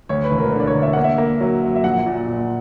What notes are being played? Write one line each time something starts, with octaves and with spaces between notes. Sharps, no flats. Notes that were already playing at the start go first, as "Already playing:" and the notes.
D2 C#5
B4
E1
A#4
D3
D5
C#5
D3
E5
A#3 F#5
E5
A#3
F#3
F#2
E5
A#1 F#5
A#2
A#2